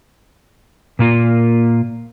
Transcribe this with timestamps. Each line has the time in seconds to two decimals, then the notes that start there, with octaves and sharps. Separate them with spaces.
0.99 A#2 A#3 F4